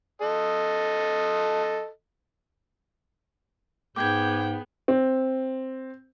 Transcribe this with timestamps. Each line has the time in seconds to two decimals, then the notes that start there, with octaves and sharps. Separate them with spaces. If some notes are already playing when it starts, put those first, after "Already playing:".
0.22 A4 D#5
3.96 G#2 B3 G#4 G5 D6 G6 G#6
4.88 C4